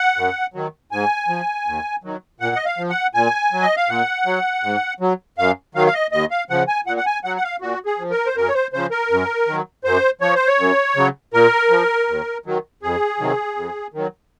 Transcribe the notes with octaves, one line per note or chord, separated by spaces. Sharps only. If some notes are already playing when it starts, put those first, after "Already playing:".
Already playing: F#5
F#2
D#3 F#3
G#2 G#5
F3
D#2
D#3 F#3
A#2 F#5
D#5
F5
F3
F#5
A#2 G#5
F#3
D#5
F5
A#2 F#5
F#3
G#2
F#3
F#2 F5
D#3 F#3 F5
F5
D#5
D#2 D#5
F5
C#3 F3 F#5
G#5
A#2 F#5
F#5
G#5
F#3 F#5
F#5
F5
A#2 F#4
G#4
F3
A#4
C5
F#2 A#4
C#5
C5
C#3 F3 C5
A#4
F#2
D#3 F#3
F#2 C5
F3 C#5
C5
C#5
F#2
C#3 F#3
A#2 A#4
F3
D#2
D#3 F#3
F2 G#4
C3 D#3 F#3
F2
D#3 F#3